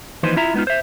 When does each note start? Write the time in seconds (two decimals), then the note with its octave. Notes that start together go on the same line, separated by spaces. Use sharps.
0.23 D#2 E3 F3 D#4 B4 C5
0.36 E4 F4 E5 A#5
0.54 G#3 B3 D#4 F4
0.67 C5 E5